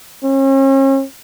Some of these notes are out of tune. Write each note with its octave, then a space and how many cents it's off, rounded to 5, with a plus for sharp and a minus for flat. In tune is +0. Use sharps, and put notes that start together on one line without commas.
C#4 -40